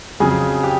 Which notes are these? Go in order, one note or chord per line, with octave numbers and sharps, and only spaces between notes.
F2 C#3 F#3 G#4
G4